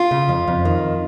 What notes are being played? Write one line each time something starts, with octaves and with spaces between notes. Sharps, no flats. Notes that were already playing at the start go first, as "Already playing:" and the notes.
Already playing: F4
C#3
F2
F2
D#3